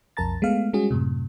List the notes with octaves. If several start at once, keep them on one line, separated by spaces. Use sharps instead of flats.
B1 F2 A#4 A5 A#5 A6
G#3 A3 B3 F5
G3 G#3 C#4 F#4 G#4
F#2 A2 C3